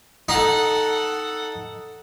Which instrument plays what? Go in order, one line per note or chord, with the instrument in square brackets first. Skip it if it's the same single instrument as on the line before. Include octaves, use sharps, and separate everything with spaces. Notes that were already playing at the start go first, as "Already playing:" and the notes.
[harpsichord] D#4 [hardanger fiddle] A4 F#5